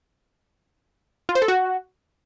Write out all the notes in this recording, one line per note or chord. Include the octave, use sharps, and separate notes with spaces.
F4
C5
A4
F#4